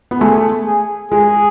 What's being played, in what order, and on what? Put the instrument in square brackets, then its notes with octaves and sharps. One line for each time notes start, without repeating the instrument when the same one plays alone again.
[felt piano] B3
[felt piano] A3 [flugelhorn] G#4
[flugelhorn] G#4
[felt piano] G#3 [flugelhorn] G#4